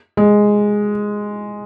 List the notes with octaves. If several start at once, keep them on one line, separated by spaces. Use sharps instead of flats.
G#3